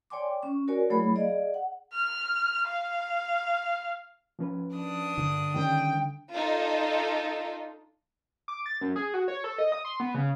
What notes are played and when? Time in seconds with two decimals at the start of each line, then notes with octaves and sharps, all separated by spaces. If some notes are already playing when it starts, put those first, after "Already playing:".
0.10 C#5 D5 G5 G#5 C6 D6
0.42 C#4 C#6
0.68 F#4 A#4 C#5 D5 G#5
0.90 F#3 A3 E4 G#4 C#5 B5
1.15 G#4 D5 D#5 F5
1.54 F#5
1.93 F6
2.67 F5
4.39 F3 C#4 B4
4.75 D4 D#6
5.18 G2 D3
5.55 D#3 G3 C#4 G5
6.33 D4 D#4 F4 A4
8.48 D6
8.66 A6
8.81 F#2
8.96 G#4
9.14 F#4
9.28 C#5
9.44 A4
9.58 D#5
9.72 D#6
9.85 C6
10.00 B3
10.15 C#3